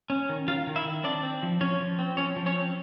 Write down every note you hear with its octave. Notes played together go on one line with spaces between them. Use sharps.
C#4
D#3
D#3 F4 F5
D#3
E4 E5
D#3
C4 D4 D5
C4
F3
F3 C#4 C#5
F3
C4
F3 C#4 C#5
F3
C#4 C#5
C4